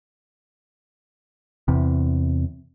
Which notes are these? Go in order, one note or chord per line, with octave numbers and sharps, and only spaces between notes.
E2 C3